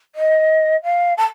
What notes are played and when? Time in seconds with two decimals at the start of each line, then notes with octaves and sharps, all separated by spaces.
0.15 D#5
0.83 F5
1.17 A5